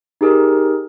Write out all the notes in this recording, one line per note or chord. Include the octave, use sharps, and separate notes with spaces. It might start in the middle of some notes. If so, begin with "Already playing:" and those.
D#4 G4 G#4 A#4